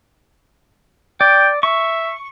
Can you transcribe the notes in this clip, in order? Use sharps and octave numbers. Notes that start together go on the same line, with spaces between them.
D5 G5
E5 C#6